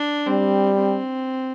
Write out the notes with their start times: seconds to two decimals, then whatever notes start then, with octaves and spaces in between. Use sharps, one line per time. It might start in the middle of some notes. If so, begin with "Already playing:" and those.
Already playing: D4
0.27 G3 C4
0.78 C4